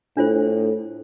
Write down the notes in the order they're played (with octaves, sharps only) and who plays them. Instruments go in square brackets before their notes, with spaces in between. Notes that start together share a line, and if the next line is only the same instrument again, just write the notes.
[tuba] A2 [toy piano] D4 F4 C5